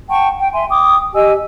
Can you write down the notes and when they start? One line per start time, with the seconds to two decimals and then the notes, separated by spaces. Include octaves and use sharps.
0.09 F#5 G5 A5 C#6
0.40 G5
0.53 E5 G#5 C6
0.70 G5 D6 D#6
1.14 G4 D#5 G#5 E6